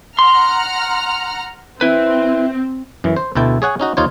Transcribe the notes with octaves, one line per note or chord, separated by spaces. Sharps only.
F#5 A#5 C6 F6
C4 E4 B4
F#2 E3
C5
D2 B2 E4 A4 G5
G#4 C#5 F#5 G#5
C#4 D#4 F#4
D#2 D#4 F4 C5 C#5